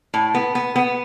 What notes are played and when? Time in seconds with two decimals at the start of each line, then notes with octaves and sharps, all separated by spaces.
0.14 A2
0.35 B3
0.55 B3
0.76 B3